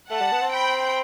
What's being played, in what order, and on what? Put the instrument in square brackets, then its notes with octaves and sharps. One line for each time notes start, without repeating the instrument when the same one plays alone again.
[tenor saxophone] A3 [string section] F#5 A5
[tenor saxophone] G3
B3
C4
[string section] G5 B5